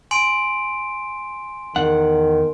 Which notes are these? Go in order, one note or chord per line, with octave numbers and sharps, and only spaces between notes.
G#5 C6 D7
E2 D#3 F#5